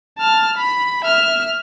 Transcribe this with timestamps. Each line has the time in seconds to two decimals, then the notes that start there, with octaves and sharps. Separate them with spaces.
0.18 A5 F6
0.57 B5
1.05 E5 F6